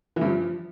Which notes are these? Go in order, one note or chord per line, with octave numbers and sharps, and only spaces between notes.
E3
G2
F3